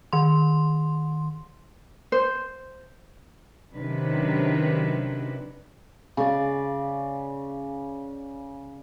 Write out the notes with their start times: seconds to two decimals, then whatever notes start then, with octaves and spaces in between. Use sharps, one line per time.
0.13 D#3 C6
2.12 C5
3.74 C3 D#3 F#3 C#4 D4 B4
6.17 C#3 D5